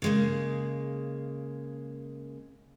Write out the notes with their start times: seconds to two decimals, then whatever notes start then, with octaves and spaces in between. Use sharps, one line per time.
0.02 C#3 G#3 A#3